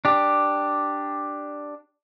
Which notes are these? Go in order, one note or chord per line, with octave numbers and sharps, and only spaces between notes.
D4 G4